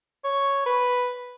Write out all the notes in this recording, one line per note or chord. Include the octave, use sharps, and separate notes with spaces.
C#5
B4